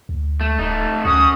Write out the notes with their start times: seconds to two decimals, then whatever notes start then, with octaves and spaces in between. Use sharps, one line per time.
0.09 D2
0.41 A3
0.58 D1 A3 D#4
1.05 D2 C#4 F#4 D#6